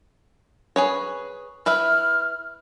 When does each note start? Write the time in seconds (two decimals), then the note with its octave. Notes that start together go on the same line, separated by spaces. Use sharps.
0.76 G#4 B4 C#5
1.66 E4 B4 E5 F6